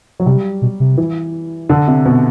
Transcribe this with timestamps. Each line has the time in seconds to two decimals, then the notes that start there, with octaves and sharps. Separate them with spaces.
0.20 F#3
0.26 C3 G3
0.62 B2
0.80 C3
0.97 E3
1.69 D3
1.88 C3
2.05 B2